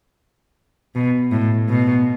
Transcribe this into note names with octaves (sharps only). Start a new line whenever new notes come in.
B2
A2
B2